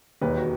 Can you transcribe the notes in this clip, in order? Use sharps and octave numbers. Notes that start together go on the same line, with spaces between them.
E1 D#2 D#3 B4
F#4